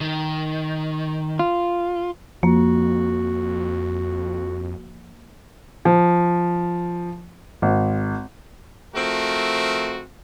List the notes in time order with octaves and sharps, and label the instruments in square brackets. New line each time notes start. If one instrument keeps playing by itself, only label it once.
[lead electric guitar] D#3
[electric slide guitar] F4
[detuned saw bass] F2 [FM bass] F3 [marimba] A#3 [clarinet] F#4
[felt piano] F3
G#1
[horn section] F3 A3 C4 F#4 A#4